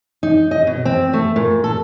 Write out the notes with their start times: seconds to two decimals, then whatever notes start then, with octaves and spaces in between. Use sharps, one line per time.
0.23 D#4
0.51 D#5
0.67 B2
0.85 C4
1.13 A3
1.36 A#2
1.64 A4